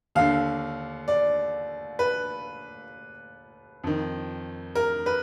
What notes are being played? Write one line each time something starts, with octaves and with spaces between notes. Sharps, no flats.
D#2 D3 F5
D5
B4
F2 D#3
A#4
B4